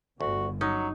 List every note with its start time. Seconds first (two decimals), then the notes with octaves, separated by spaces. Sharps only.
0.21 G1 D2 G2 D3 F#4
0.61 F#3 C#4 D#4